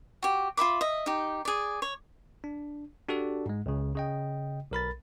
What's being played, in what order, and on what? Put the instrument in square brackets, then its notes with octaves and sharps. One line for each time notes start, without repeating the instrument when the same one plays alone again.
[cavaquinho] F#4 G4
F4 E5 B5 D6
D#5 E5
D#4 G4
G#4 D5
C#5
[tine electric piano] D4
D4 F#4 G4 A4 D5
G#2 G#3
C#2 C#3
C#3 D#5 G5
B1 A#4 B5 A6